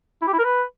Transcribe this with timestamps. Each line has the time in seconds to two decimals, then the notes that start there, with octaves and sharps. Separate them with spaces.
0.22 E4
0.27 G4
0.33 E4
0.39 A#4
0.44 B4